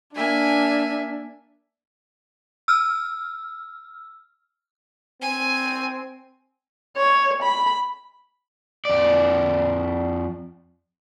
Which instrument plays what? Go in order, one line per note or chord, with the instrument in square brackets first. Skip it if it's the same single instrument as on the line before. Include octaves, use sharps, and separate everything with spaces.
[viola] A#3 E5 [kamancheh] D4 [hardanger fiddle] G#5
[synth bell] E6 F6
[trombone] C4 [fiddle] G#5
[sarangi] C#5
B5
[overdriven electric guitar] F2 D5